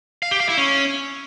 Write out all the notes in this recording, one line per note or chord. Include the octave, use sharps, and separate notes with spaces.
F5
G4
F5
E4
C#4